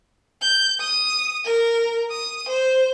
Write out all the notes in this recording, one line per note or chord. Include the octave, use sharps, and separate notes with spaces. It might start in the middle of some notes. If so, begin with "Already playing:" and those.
G6
D#6
A#4
D#6
C5